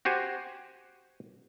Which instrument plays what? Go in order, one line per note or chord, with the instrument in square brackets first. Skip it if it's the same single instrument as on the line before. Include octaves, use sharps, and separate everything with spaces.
[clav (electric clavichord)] F#4 G4 C5 G#5